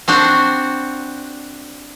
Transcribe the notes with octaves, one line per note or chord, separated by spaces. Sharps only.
C4 D4 F#4 C5